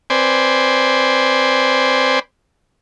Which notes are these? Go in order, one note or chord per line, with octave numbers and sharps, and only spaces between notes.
C4 B4 C5 D5 G#5